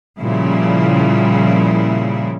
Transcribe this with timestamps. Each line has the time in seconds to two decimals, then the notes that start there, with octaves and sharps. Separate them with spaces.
0.19 A#2 C#3 F3 G3 E4